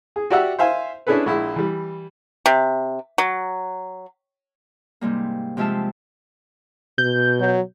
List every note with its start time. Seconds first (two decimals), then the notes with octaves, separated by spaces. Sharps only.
0.16 G#4
0.30 F#4 G4 D5 E5 F#5 E6
0.59 C5 E5 F5 G#5 C6
1.07 C#4 D4 E4 G#4 A4 B4
1.26 A#1 G#3 E4
1.56 E3 G3
2.46 C3
3.18 F#3
5.01 G#2 C3 G3 A#3
5.57 C3 F3 G#3 F4 E5 A5
6.98 B2 G6
7.40 F#3